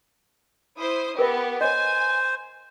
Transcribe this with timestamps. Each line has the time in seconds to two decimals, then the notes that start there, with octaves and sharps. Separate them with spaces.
0.77 E4 C5 D#6
1.19 B3 G4 A#4 B4 E5
1.61 C5 C#5 D#5 G#5